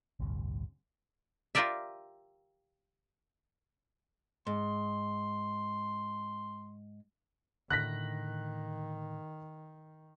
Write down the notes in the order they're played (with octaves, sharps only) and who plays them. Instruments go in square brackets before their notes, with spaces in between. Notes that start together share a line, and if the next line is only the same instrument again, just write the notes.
[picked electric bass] A1 D2 G2 C3
[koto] F4 G4 A#4 D5 E5
[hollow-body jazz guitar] G#2 [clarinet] C6
[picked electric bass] A2 D3 [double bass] D#3 [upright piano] F#6 A#6 B6